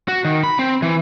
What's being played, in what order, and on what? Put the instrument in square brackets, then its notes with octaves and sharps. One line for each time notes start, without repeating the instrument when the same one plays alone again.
[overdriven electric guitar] F#4
D#3
B5
C4
E3